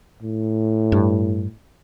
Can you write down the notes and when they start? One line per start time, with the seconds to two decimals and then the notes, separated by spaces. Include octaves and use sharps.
0.22 A2
0.92 G2